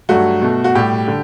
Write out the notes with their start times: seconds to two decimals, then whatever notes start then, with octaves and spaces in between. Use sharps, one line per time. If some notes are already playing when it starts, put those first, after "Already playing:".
0.09 G2 F#3 A3 F#4
0.42 B2 A3
0.64 F#4
0.75 A2 G3 G4
1.08 D3